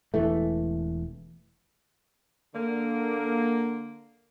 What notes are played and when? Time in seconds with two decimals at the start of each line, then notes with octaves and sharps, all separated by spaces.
0.14 E1 E3 A3
2.54 D3 A#3